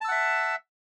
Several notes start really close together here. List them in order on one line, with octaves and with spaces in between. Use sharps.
A5 E6 F#5 E5